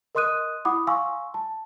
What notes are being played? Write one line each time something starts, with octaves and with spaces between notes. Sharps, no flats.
A#4 D#5 C6 D#6 F#6 D#7
E4 F#5 B5 D6 D#6
F5 G#5 C6 C#6 E6
A5